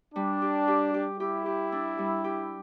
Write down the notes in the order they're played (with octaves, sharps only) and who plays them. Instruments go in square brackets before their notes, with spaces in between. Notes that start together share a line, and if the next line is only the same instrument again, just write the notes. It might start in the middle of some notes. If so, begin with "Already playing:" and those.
[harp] G3 [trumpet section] D4
[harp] G4
G4
G4
[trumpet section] E4 [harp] G4
[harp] G4
D4
G3
G4